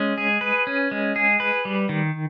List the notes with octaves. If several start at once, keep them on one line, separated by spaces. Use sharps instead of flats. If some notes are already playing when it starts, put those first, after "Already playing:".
Already playing: G#3 C#4
G#4
B4
C#4
G#3
G#4
B4
G3
D#3